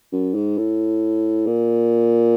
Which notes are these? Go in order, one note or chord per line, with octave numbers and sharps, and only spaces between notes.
F#2
G#2
A2
A#2